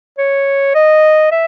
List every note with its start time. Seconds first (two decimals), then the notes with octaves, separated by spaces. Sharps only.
0.18 C#5
0.75 D#5
1.32 E5